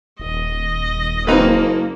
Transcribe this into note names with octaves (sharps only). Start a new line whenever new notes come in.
D#1 D#5
F#1 A#3 C4 D#4 B4